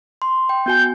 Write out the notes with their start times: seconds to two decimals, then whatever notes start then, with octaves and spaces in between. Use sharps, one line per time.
0.22 C6
0.49 G5
0.66 B3 F#4 G#5 G6